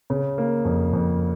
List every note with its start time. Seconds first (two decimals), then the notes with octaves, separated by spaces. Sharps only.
0.10 C#3
0.38 A#3
0.65 F2
0.93 F2